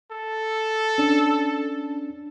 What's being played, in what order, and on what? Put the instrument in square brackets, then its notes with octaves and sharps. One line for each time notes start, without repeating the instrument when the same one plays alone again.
[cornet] A4
[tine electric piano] C#4 D4